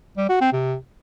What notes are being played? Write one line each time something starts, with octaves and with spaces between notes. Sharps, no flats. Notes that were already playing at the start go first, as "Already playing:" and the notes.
G3
F#4
C4
C3